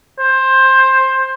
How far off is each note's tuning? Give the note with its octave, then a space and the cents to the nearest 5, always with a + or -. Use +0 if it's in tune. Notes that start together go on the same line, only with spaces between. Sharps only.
C5 +15